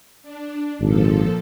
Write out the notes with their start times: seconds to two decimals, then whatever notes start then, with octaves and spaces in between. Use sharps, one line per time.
0.23 D4
0.80 G#1 A#2 F3 A4